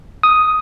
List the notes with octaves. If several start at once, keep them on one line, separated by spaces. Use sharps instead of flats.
D#6